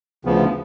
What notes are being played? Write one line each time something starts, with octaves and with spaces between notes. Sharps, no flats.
D2 C#3 F3 B3